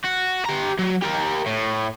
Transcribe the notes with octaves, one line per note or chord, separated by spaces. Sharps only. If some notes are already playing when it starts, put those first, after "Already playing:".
F#4
G4 A#5
F#3
G4 A#4
A2